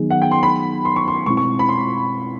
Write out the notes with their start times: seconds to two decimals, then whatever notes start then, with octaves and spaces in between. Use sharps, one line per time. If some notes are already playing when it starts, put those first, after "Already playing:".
Already playing: D#3 F#3 B3 D#4 G#4
0.10 F#5
0.22 G5
0.31 C6
0.43 B5
0.85 C6
0.96 C#6
1.08 C6
1.26 B2 G#3 C4 E4 C#6
1.37 C#6
1.59 B5
1.69 C6